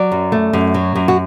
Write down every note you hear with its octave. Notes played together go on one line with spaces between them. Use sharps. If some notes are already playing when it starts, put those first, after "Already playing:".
Already playing: F#3 D5
F#2
A3
F#2
F#3
F#2
F#4